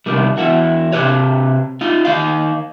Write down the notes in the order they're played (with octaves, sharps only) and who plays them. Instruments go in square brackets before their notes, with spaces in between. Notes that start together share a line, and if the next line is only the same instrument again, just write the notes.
[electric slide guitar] C3 D#3 G3
E2 C#3 E4 F#4
C3 A#3 G4 B4 C#5
D#4 F4
D#3 D#4 F5